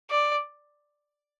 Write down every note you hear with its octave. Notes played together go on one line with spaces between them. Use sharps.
D5